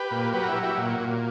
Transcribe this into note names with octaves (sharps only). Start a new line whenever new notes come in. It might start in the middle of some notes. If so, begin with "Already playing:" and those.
Already playing: G4 B4
A#2
F#3 G4 B4
A#4
E4 G4
F#3
E4 G4
A#2
A#2